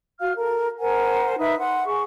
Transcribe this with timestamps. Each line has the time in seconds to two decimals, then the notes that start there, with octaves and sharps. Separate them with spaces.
0.20 F#4 F5 F6
0.38 A4 A#4
0.79 A#4 C5 F#5 G#5
1.38 D#4 B4 E5
1.59 F#5 C6
1.85 G#4 C#6